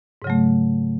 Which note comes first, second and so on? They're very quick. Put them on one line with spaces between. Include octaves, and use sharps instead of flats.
G#2 C#3 F#3 A3